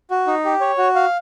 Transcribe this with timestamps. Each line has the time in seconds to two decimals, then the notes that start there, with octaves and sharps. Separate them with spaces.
0.11 F#4
0.27 D#4
0.45 G4
0.61 C#5
0.78 F#4
0.95 F5